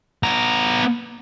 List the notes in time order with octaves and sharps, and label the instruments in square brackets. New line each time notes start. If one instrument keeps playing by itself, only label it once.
[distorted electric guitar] B3 A#5